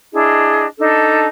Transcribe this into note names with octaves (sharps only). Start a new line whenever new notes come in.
D4 E4 G#4 D#5
D4 D#4 A4